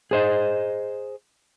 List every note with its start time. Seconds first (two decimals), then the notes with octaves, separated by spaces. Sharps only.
0.11 G#4 C5 D#5